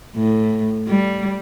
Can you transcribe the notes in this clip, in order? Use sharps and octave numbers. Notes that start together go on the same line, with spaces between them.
A2
G3